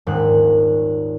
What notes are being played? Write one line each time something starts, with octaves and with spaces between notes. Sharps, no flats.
D#1 G#2 F#6